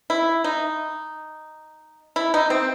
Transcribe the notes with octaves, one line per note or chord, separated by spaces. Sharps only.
E4
D#4
E4
D#4
C4